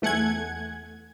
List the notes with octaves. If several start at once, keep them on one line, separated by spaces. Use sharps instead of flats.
E2 A3 F#5 G#5 G#6